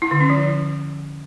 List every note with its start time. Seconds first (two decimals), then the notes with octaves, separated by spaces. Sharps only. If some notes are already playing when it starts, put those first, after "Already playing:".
0.02 E4
0.11 D3
0.20 C#4
0.30 F3